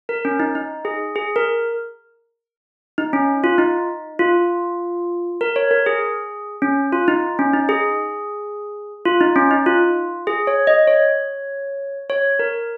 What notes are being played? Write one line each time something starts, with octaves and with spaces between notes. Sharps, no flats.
A#4
C#4
D#4
D#4
G#4
G#4
A#4
D#4
C#4
F4
D#4
F4
A#4
C#5
A#4
G#4
C#4
F4
D#4
C#4
D#4
G#4
F4
D#4
C#4
D#4
F4
G#4
C#5
D#5
C#5
C#5
A#4